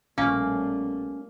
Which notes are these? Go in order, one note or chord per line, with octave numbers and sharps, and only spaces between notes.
A#1 B2 G3 A3 A#3 C#4